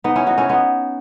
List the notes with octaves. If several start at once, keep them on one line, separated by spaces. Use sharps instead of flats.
B3 D#4
C#4 E4
D#4 F#4
C#4 E4
B3 D#4